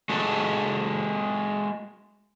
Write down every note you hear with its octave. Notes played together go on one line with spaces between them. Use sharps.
G#3 F#4 A4